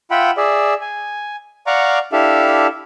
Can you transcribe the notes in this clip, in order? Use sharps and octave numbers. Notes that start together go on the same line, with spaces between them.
F4 E5 F#5 G5 B5
G#4 D5 E5
G#5
D5 F5 F#5 A#5 C#6 D6
D4 E4 G4 A4 E5 F5